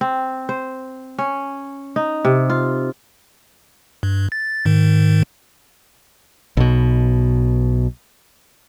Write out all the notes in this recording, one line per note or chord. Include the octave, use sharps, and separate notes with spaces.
C4
C5
C#4
D#4
C3
F4
G2
A6
G#2 D#3
B1 B2